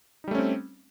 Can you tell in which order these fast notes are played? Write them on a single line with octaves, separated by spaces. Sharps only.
D#4 G3 A3 C#4 C4